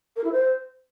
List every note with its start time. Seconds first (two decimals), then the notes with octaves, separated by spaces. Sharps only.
0.16 A#4
0.24 E4
0.32 C5